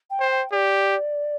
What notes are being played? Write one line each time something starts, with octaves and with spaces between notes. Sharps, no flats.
G5
C5
G5
G4 D5